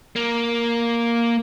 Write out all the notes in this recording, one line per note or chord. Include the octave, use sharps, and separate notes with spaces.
A#3